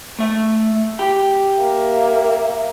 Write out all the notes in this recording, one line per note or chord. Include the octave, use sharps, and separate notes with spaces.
A3 E5
G4 G5
A#3 E5